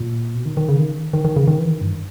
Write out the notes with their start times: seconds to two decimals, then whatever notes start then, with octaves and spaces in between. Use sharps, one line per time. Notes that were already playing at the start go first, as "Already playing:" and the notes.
Already playing: A#2
0.35 B2
0.45 D#3
0.57 D#3
0.69 C#3
0.80 D#3
1.13 D#3
1.25 D#3
1.36 C#3
1.48 D#3
1.59 E3
1.70 D#3
1.81 G2